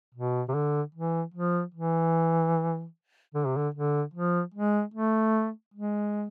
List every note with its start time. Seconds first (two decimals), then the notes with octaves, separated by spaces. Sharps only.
0.14 B2
0.48 C3
0.54 D3
0.95 E3
1.34 F3
1.74 E3
3.34 D3
3.45 C3
3.56 D3
3.74 D3
4.14 F3
4.54 G#3
4.94 A3
5.74 G#3